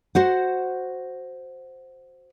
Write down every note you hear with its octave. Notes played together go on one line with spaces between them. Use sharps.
F#4 C5 F#5